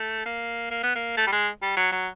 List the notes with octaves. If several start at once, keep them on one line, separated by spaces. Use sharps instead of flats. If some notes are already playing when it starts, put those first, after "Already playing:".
Already playing: A3
A#3
A#3
B3
A#3
A3
G3
G#3
G3
F#3
F#3